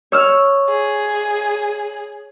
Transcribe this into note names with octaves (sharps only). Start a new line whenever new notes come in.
C#5 E6 F6
G#4